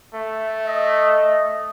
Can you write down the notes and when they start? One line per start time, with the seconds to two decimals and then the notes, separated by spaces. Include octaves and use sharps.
0.14 A3
0.68 D#5